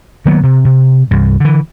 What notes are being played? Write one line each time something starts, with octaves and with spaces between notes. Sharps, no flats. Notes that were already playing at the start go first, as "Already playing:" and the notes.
D#3 F#3 A#3 B3
C3
C3
C2 G2
D3 E3